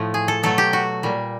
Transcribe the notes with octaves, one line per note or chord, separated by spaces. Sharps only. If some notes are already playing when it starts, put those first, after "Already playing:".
Already playing: A2 F3 A3
G#4
A4
B2 F#3 A3 A4
G4
F#4
A#2 G3